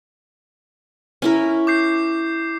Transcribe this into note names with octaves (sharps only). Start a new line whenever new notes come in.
C#4 E4 A#4
D6 G6 C7